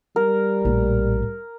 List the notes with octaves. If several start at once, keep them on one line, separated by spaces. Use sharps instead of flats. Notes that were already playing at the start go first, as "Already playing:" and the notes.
G3 A#4
A#1 A2